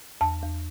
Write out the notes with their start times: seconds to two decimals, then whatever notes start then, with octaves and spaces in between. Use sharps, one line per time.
0.21 E2 A5
0.42 E2